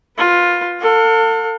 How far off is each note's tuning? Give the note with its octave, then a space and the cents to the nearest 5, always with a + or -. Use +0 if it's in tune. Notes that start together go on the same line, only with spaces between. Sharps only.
F4 +10 B4 +0
A4 +35 F5 +45